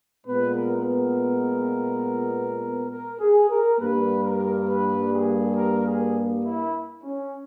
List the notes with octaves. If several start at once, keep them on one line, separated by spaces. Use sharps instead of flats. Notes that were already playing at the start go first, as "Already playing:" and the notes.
A#2 G#3 B3 B4
A#4
A#4
A#4
G#4
A#4
G2 G3 A#3 B4
A#4
B4
G#4
A#4
G#4
E4
C#4